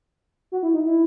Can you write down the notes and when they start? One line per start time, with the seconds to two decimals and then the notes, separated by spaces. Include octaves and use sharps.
0.52 F#4
0.63 E4
0.74 D#4
0.86 E4